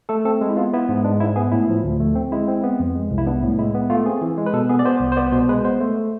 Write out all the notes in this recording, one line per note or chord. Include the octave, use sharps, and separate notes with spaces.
A3 A4
C4 A4
G#3
E4
B3 F4
B3 E4
G#2
G#3 D4
G#2 E4
B3 G#4
A2 E4
F3
D2
A3
C4
G#3 E4
C4
B3
F2
G#3
C2
E4
B3 D4
A2
G#3 E4
B3
A3 F4
C4 G#4
E3
G#3
B4
B2 A4
B3 G#4
D5
B3 C5
C2
C5
B3 D5
B2 C5
G#3 B4
B3 C5
A3